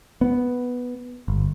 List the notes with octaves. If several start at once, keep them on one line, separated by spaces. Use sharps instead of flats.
B3
G1